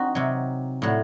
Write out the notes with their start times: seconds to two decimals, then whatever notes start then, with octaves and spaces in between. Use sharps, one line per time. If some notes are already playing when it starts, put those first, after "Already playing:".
Already playing: C4 D#4 F#4
0.15 C3 F#3
0.82 A2 F#3